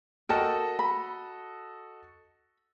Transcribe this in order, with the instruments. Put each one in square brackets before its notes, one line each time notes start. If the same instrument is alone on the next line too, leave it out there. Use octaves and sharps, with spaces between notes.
[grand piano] F#4 A4 D#5 [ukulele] A#4 G5 A5
[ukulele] B5